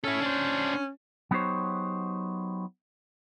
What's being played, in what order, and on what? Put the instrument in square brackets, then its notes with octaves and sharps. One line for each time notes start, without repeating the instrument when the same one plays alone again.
[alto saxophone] C#4 [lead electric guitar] E4 A4
[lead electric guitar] D4 C5
[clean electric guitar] F#3 B3 D#4 G4 C5 C#5